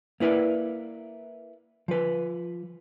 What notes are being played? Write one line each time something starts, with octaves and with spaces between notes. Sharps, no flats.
A#3 E4 B4 D5
F3 B4